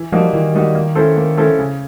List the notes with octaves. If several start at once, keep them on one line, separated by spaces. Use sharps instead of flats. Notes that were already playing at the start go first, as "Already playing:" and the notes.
Already playing: E3
F3 G3 A#3 D#4 F#4
D#3 E3
G3 A#3 D#4 F#4
A#3
C#4 E4 A4 C5
A#3
C#4 E4 A4 C5
C#3